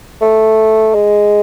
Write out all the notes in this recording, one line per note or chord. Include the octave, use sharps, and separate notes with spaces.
A3
G#3